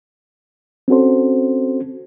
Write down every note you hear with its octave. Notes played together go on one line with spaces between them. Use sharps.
C4 C#4 F#4 A4 C5